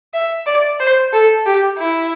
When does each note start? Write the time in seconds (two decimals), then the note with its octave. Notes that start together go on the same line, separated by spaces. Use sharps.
0.14 E5
0.46 D5
0.80 C5
1.13 A4
1.45 G4
1.78 E4